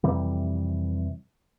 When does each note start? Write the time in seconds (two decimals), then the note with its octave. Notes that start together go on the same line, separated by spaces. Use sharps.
0.04 F2 C3 E3 G3